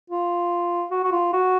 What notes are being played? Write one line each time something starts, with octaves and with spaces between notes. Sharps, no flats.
F4
F#4
F#4
F4
F#4